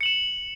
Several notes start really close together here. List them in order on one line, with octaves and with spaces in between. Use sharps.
C#7 F#7 E7